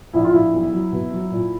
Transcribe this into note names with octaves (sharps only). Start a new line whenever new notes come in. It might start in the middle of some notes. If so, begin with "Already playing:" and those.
A#1 E4
F4
A#1 E4
B1
F#3
B2
F#3
A#2